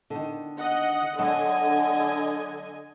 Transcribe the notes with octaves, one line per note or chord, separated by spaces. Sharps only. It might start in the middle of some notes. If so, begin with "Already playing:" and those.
D3 D#3
D#5 F#5
D3 F#3 D#5 F#5 G#5